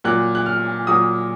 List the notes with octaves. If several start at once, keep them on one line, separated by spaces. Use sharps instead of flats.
A#2 F#3 F#6
F#6
F6
A#2 F#3 D#6